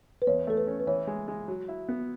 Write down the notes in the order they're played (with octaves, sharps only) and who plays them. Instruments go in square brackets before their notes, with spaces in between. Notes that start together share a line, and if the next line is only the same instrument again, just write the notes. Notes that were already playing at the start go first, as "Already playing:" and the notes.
[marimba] B4
[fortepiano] E2 [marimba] C#5
[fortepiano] A3 [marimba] A4
[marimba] B4
[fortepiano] C#4
[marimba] B4
[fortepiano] E3 [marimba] C#5
[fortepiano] G#3
G#3
F#3
E4
B3